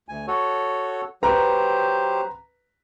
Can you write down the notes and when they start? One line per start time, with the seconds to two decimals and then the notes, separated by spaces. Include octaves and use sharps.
0.09 D2 G#5
0.27 F#4 A4 C#5
1.23 F#3 G4 B4 C5 A#5